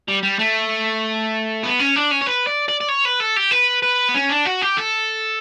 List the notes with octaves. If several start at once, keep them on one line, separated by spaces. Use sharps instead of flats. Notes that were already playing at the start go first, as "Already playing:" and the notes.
G3
G3
A3
B3
C#4
D4
C#4
C#5
B4
D5
D5
D5
C#5
B4
A4
G4
B4
B4
B3
C#4
D4
F#4
G4
A4